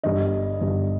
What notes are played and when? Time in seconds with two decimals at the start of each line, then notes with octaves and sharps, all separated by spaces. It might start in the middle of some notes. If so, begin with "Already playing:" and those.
0.04 G1 G2 D3 D#5
0.61 G1 G2 D3